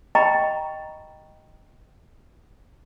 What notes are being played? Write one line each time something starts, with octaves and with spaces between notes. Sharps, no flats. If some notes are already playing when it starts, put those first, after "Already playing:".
D#5 G5 A#5 B5 C#6